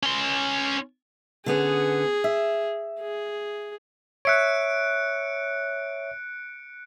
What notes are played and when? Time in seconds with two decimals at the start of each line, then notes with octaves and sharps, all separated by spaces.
0.03 C#4 C6
1.46 D3 B3 C#4 G#4
2.24 E5
3.01 G#4
4.25 C#5 E5 F#6 C#7 D7